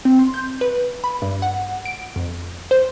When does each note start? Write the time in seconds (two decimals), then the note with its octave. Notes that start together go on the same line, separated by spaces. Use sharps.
0.05 C4
0.19 C6
0.34 G6
0.61 B4
1.04 B5
1.22 G2
1.42 F#5
1.86 D7
2.16 F2
2.71 C5